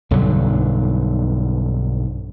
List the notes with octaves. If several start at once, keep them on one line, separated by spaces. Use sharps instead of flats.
B1 G2 D3 F#3